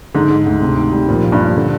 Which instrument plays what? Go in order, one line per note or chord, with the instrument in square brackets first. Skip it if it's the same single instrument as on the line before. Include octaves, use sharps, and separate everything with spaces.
[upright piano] G#2 [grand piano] D3
[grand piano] G#3
D2
C3
D#3
G3
[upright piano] A#2 [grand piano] F3
[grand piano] A#3
[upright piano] G2
[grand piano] A#2
D3